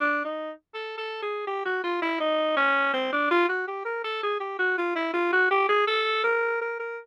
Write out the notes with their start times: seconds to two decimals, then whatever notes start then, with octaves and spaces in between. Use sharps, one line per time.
0.01 D4
0.25 D#4
0.74 A4
0.98 A4
1.22 G#4
1.47 G4
1.65 F#4
1.84 F4
2.02 E4
2.20 D#4
2.57 C#4
2.93 C4
3.12 D4
3.31 F4
3.49 F#4
3.68 G4
3.85 A#4
4.04 A4
4.23 G#4
4.40 G4
4.59 F#4
4.78 F4
4.95 E4
5.14 F4
5.33 F#4
5.51 G4
5.69 G#4
5.87 A4
6.24 A#4
6.61 A#4
6.79 A#4